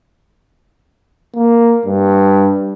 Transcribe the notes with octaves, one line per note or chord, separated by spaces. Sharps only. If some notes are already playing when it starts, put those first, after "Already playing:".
A#3
G2